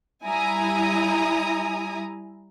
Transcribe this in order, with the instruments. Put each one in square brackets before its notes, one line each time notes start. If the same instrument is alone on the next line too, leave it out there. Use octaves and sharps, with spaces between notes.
[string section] G3 E4 G#5 A#5 D#6